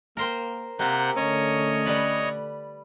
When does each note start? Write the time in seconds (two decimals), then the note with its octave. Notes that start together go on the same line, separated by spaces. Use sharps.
0.17 A#3 A#4 C5 G5
0.79 C3 A#3 G4 F#5 G6
1.16 D3 A3 C#4 C#5 D#5
1.85 G3 B4 D5